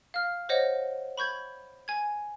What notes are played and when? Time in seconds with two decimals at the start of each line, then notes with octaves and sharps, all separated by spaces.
0.14 F5 F6
0.49 C5 C#5 D#5 F#5
1.17 B5 C#6 G6 G#6
1.88 G#5 G#6